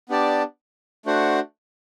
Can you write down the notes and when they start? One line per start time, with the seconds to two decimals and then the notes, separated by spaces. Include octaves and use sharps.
0.09 B3 D4 G4 D5 A5
1.06 A3 D4 F#4 C5 F#5